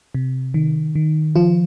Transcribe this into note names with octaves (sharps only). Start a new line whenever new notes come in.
C3
D#3
D#3
F3 F4